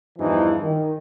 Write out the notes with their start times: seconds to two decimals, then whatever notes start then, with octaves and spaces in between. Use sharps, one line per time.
0.19 E2 G2 E3 F3 D#4
0.61 D#3